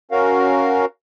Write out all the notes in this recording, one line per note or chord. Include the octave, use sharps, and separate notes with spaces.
C#4 F#4 A#4 F5